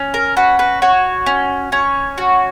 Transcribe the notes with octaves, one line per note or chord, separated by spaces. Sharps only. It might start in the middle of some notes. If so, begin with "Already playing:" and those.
Already playing: C#4
A#4
F#4 B4
B4
F#4 C#5
C#4
C#4 C#5
F#4